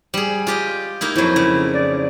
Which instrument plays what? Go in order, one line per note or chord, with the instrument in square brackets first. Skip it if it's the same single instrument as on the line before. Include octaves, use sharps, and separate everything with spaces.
[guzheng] G3 G#4
F4 G4 D#5
A#3 D#4 E4
[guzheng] F2 F#3 [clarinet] E4
[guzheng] C#3
[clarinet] D5